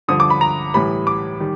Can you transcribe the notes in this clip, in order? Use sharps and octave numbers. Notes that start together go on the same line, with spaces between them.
G2 D3 F3 D#6
D6
B5
A#5
A2 E3 G3 B5
D6
D#3 G3